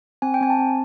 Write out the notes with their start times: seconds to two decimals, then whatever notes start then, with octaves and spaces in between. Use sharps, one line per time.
0.22 C4 G#5
0.34 G5
0.41 C4 G#5
0.50 A5
0.59 C4